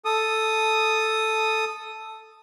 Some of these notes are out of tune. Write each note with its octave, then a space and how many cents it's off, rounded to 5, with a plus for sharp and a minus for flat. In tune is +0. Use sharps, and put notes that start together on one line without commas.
A4 +0 D#6 +0